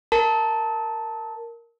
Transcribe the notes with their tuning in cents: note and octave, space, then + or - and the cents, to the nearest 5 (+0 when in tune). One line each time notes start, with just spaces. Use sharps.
A#4 +0 A5 +0